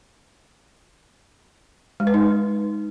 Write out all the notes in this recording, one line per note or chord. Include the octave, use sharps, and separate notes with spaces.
G#3
B4
D#4